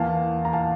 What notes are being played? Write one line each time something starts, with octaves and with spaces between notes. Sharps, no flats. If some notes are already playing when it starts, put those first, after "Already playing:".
Already playing: E2 E3 A#3 F5 A5
A#5
F5 A5